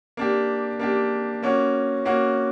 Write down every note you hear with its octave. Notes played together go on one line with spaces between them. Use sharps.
A#3 D4 G4
A#3 D4 G4
A#3 C#4 F#4
A#3 C#4 F#4